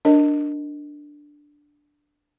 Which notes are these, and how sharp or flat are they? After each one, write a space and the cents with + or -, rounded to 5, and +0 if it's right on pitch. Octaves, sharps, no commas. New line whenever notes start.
D4 +0 A#4 +0 D#5 +0